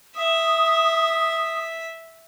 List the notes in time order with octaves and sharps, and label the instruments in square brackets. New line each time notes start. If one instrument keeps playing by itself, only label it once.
[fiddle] E5 [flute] D#6